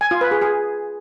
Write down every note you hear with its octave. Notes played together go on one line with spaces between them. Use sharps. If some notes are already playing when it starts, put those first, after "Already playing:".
G#5
F4
B4
G#4
G#4